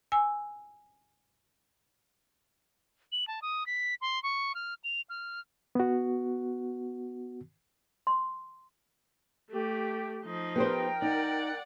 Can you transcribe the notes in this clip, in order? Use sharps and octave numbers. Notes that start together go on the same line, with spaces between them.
G#5 E6
F#7
A5
D#6
B6
C6
C#6
F6
F7
F6
B3 F#4
C6
A3 G4
F3 D#4
B3 G4 A#4 C5 G5
D#4 D5 F#5